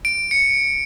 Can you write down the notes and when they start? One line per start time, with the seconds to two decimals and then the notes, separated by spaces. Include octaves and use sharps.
0.05 D7
0.31 C#7